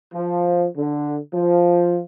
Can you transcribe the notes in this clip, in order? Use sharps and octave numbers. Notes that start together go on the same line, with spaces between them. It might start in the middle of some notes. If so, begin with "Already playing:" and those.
F3
D3
F3